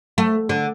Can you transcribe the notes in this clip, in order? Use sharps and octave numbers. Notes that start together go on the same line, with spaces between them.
A3
D3